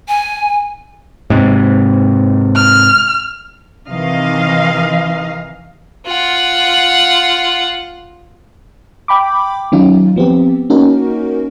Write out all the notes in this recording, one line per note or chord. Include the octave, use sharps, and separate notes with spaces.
G#5
G#2 C3
F6
C3 D#3 E3 D#5 F5
F4 F#5
G5 B5 D6
D#3 F#3 C#4 D#4 F4
F3 B3 C4 G4
A#3 C#4 D#4 F#4 A#4